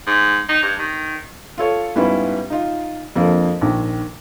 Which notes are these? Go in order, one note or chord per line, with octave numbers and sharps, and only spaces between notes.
G#2
D#4
G2
D#3
F4 A4 C#5
G#2 G3 B3 C#4 E4 F4
D#4 F4
F2 D3 F3 A#3
A#1 D#3